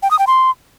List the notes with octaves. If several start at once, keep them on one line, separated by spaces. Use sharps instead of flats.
G5
D#6
G5
C6